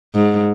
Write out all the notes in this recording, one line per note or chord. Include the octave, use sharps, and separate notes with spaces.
G#2